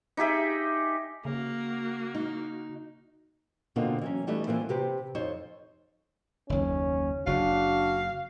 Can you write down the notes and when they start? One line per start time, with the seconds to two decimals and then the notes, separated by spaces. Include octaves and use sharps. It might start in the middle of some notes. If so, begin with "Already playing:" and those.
0.17 D#4 G4 G#4 E5
1.25 C#3 A#3 F#4
2.15 D#4
3.76 B2 D3 A#3 C4 F4
4.01 E3 F#3 C#4
4.27 E3 G3 A3 D#4
4.47 E3 F3 A#3 C4
4.69 C3 C4 G4 B4
5.15 F2 D#4 C5 C#5
6.50 F#1 D#2 C#4
7.27 F#1 C#3 D4 F#4 F5